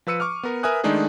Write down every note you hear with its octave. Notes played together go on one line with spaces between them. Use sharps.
F3 B4 E6 C#7 D#7
C#6 D6 F6
B3 A#4
A#4 B4 E5 G#5 D#6 F#6
D#3 G#3 A3 D4 D#4 G#4